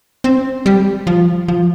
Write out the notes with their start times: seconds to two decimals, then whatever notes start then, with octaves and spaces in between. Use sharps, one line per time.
0.24 C4
0.66 G3
1.07 F3
1.48 F3